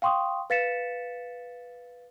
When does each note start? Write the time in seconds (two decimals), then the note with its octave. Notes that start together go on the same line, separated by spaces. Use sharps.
0.02 F5 G5 C6 C#6 D#6
0.50 B4 F5 A6 B6 C#7 E7